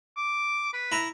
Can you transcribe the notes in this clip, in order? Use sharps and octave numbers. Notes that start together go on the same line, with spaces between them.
D6
B4
E4 A#5